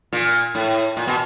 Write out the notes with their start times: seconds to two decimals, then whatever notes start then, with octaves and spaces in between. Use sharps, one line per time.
0.13 A#2
0.55 A2
0.97 A#2
1.07 B2